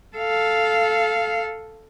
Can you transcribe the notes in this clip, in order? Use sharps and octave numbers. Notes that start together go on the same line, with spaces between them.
A4 F5